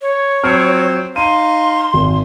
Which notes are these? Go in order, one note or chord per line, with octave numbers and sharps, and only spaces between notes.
C#5
F3 F#3 C4 F6
D#4 F5 C6 D#7
G#1